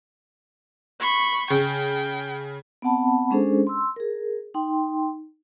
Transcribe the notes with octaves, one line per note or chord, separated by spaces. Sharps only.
B5 C#6
C#3 G5
B3 C4 F#5 A5 B5
G#3 C#4 D4 G#4 A4 C5
C6 E6
G#4 A#4
D#4 G5 C6